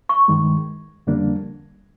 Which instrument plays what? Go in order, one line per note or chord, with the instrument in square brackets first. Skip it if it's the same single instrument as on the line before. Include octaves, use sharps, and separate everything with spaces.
[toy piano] C#6
[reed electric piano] G2 D#3 G#3
F2 D3 G3 A#3 D4